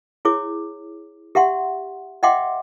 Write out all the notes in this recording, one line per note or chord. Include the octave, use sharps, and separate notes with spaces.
E4 G#4 C#5 D6
G4 E5 F#5 C6
D#5 E5 F#5 G5 C6 D6